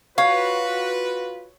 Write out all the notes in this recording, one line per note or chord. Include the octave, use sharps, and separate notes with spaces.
F4 F#4 B4 C#5 F5